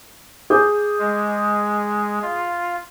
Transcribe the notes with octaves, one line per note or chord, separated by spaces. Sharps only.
G#4 D6 G6
G#3
F4